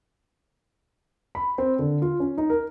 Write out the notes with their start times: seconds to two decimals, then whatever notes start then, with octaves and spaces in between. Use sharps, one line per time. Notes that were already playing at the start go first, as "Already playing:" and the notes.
1.35 B5
1.58 C4
1.79 D3
2.02 F4
2.20 C#4
2.38 D#4
2.50 A#4